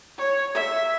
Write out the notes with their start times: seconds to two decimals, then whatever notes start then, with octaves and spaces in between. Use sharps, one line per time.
0.18 C#5
0.55 E5